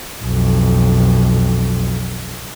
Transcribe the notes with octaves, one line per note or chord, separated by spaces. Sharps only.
B1 F2